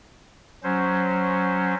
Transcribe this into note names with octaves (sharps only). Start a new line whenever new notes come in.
F#3 C#4 C5